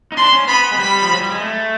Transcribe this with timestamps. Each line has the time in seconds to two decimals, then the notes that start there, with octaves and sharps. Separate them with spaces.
0.12 D#4
0.17 D4 C6
0.33 C#4
0.48 B3 B5
0.72 G#3
0.79 G3 B5
1.02 F3
1.12 F#3
1.21 G3
1.31 G#3
1.41 A3